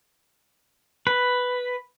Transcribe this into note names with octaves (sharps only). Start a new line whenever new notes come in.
B4